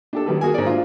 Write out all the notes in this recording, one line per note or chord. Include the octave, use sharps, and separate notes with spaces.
D4 G4 A4
D#3 F#3 G3 A4 B4
F#4 G#4 A#4 G#5
G#2 D5
D4 F4